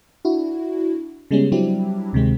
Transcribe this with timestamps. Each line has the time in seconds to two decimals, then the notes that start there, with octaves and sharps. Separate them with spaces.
0.25 D4 E4 F#4
1.31 C#3 G3 G#3 B3 C#4
1.52 F#3 G3 C4 D4 E4 G4
2.13 D2 C3 D#3 G#3 C4